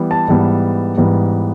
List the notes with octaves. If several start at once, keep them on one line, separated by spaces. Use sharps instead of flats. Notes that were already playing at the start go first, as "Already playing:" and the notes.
Already playing: E3 G3 B3
A5
G#2 E3 G3 B3
G#2 E3 G3 B3